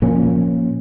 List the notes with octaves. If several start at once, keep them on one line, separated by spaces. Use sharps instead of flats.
A#2 F3 A#3 C#4